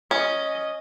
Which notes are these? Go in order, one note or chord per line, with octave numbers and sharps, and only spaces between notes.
C#4 D#5